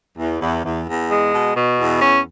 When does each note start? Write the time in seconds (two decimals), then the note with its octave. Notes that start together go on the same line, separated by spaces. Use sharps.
0.18 E2
0.41 E2
0.64 E2
0.88 E2
1.11 G#3
1.33 B2
1.56 B2
1.79 E2
2.02 C#4